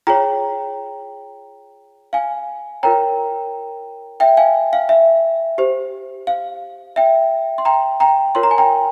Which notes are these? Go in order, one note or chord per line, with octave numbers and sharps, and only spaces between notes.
F4 G#4 C#5 G5 A#5
F5 G#5
F4 A#4 C#5 G5 A#5
E5 G5
F5 G#5
F5
E5
G4 C5
F5
E5 G5
C6
G5 A#5
G5 A#5
F4 A#4 C#5 C6
A#5
G#5
G5 A#5